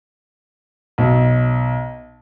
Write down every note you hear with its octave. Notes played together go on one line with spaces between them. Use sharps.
B1